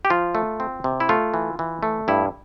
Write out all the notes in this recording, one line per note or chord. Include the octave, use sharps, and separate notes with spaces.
G4
F3 F4
A3
C4
C3
E4
A3 F4
E3
E3
A3
G2 E4